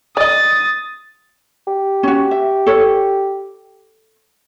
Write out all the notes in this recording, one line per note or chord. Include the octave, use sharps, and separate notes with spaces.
D5 D#5 D#6 A6
G4
C#4 F#4
E5
A4 C#5